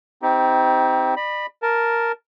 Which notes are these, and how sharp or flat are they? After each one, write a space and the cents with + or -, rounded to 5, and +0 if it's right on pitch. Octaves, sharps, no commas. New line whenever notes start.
C4 -15 D#4 +30 G4 +0
D5 +40 B5 -5
A#4 +0 A5 +0